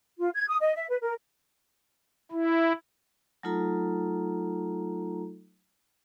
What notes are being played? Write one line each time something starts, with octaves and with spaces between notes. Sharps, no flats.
F4
G#6
D#6
D#5
E5
B4
A#4
E4
F#3 A3 D#4 F4 A4 A#5